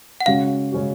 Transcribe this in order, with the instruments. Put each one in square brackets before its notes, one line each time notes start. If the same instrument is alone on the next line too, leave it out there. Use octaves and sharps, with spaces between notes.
[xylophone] F#5
[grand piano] C#3 G#3 C#4 F#4 [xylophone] F5
[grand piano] C#3 G#3 C#4 F#4